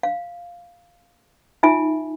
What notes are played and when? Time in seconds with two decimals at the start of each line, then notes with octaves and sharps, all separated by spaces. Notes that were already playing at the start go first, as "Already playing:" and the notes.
0.03 F5
1.63 D#4 F4 E5 G#5